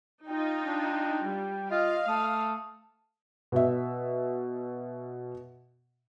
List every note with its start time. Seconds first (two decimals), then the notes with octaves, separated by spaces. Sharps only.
0.28 D#4 F4 G5
0.65 D4
1.25 G3
1.71 F4 D#5 F5
2.08 A3 D#6
3.52 B2 E5